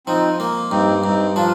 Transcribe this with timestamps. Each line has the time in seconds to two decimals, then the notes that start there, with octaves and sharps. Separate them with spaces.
0.06 F3 C4 D#4
0.40 A#3
0.71 G2 C4 D#4
1.04 G2 C4 D#4
1.36 F3 D4 F4